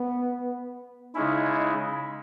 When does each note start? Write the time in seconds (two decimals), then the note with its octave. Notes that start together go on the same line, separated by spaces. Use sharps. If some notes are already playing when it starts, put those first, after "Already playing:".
Already playing: B3
1.15 C#3 G#3 C#4 D#4 E4